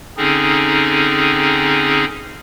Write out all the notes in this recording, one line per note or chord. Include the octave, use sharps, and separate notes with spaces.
D3 C4 C#4 D#4 G#4